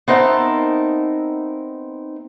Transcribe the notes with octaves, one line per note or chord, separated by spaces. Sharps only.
B3 C4 D#4 A#4 E5 A5